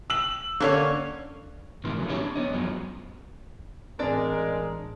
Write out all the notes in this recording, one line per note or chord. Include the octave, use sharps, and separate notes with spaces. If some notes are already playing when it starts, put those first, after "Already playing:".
E6 F#7
D3 A#3 C#4 C#5
A2 C3 D#3 E3 A#3 F4
C#3 F#3 G3 A3
B3 C#4 D#4 E4 G4 C#5
D4
B3 C#5 D#5
F#2 F3 F#3 G#3 B3
A1 G#3 C4 D4 A#4 D5